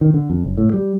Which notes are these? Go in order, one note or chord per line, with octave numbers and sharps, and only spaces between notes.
D#3
D3
F2
F#1
A2
G3